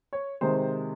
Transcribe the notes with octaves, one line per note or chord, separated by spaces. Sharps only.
C#5
C3 D#3 G#3 C5